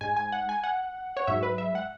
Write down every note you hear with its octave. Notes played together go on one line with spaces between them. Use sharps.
G#2 G#3 G#5
G#5
F#5
G#5
F#5
C#5
G#2 F#3 E5
B4
E5
F#5